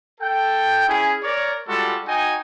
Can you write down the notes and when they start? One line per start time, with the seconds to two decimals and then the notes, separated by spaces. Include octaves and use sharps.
0.21 A4 G5
0.88 C#4 E4 G#4
1.23 A#4 C#5 D5
1.68 G3 G#3 F4 F#4 A4
2.06 D#4 F#4 D#5 G5 G#5